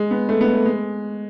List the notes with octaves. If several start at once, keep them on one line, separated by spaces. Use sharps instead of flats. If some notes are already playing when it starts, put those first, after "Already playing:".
Already playing: G#3
B3
A3
B3
A3
G#3